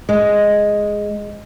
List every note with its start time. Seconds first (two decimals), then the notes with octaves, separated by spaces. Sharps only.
0.09 G#3